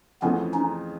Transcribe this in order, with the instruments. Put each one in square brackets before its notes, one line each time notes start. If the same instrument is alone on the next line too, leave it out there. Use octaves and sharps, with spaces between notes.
[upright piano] F2 C#3 E3 A3 [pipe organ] B3 C#4
[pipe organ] C#4 D#4